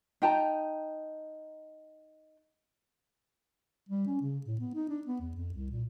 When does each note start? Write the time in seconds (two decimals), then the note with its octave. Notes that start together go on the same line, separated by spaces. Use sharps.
0.22 D#4 G5 A5 A#5
3.89 G3
4.07 C#4
4.21 C#3
4.46 A2
4.60 B3
4.75 D#4
4.89 D4
5.07 B3
5.21 E2
5.35 F2
5.54 C2
5.71 A#2